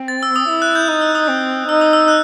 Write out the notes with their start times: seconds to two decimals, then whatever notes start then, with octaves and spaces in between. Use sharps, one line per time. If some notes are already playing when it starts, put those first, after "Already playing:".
Already playing: C4
0.08 A6
0.23 E6
0.36 D#6
0.49 E4 E6
0.62 F#6
0.75 G6
0.88 D#4 G6
1.01 E6
1.15 D#6
1.28 C4
1.69 D#4 E6
1.81 D#6
1.93 E6
2.08 F#6